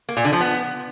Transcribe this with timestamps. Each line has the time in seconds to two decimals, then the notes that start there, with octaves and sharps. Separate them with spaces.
0.09 A#3
0.17 A#2
0.25 D3
0.33 F3
0.41 B3